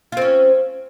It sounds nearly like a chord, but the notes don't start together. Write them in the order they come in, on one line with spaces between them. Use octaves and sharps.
F4 C4 C#4